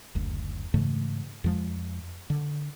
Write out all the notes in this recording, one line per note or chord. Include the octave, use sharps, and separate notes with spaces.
F#1 D2
G#2 C#3 E3 A3
F2 F3 G#3
D3